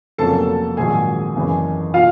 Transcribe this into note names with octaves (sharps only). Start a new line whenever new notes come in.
F1 F2 C#3 F#3 A#3 A4 A5
A#1 G#2 D#3 F#3 G#4 G#5
F#1 E2 C#3 E3
B2 F4 F5